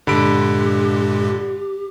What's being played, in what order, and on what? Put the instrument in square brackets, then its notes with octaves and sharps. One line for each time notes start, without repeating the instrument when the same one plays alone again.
[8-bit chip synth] G2 A#2 G#3 [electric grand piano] D3 B5 D7 [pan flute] G4